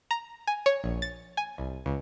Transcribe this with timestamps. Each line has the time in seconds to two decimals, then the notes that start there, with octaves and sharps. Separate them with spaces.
0.11 A#5
0.47 G#5
0.66 C#5
0.84 A#1
1.02 A6
1.37 G#5
1.58 C2
1.86 C#2